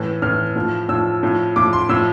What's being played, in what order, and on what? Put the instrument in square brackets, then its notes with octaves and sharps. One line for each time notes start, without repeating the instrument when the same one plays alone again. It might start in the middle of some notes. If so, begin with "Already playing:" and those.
Already playing: [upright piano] A2 E3
A2 E3 F6
A2 F3
A2 F3 E6
A2 F3
A2 F3 D6
C6
A2 F3 E6